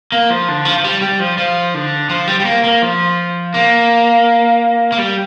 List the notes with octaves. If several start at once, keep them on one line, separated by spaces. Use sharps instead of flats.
A#3
F3
D3
F3
F3
G3
G3
F3
F3
D3
F3
G3
G3
A#3
A#3
F3
A#3
A#3
G3